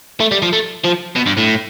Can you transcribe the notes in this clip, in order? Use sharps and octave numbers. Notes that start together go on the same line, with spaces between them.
A3
G3
F3
A3
F3
B2
G2
A2